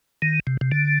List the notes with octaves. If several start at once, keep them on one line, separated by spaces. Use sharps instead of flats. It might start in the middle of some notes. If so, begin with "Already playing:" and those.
D#3
C3
C3
D3